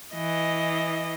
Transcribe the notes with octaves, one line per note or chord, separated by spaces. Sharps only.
E3 D#5